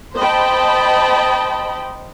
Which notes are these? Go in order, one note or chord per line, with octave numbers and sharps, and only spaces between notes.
C5 D#5 G5 A5 B5